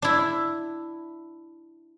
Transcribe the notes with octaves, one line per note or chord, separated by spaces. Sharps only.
D4 E4